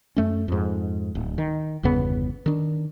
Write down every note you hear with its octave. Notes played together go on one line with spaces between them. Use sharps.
F#2 A3 C#4
F2 G#2
D1
D#3
G1 E2 C#3 B3
D#3 D4